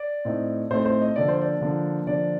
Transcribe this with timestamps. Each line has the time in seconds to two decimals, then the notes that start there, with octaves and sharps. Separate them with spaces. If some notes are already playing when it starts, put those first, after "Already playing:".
Already playing: D5
0.25 A2 A3 C4 D#4
0.70 A2 A3 C4 D#4 C5
0.86 C5
1.01 D#5
1.16 D3 F3 A#3 D4 D5
1.28 C5
1.41 D5
1.61 D3 F3 A#3 D4
2.07 D3 F3 A#3 D4 D5